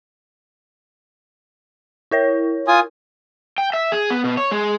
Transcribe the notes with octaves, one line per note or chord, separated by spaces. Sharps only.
E4 A#4 C#5
F4 G#5 D#6
G5
E5
G#4
B3
B2
C#5
G#3